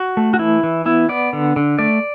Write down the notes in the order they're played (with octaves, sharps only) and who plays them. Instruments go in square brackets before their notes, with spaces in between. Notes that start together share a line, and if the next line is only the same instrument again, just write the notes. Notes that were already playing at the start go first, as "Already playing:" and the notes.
Already playing: [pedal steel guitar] F#4
A3
F#4
E3 E4
E3
B3 E4
B3 D5
D3
D3
A3 D5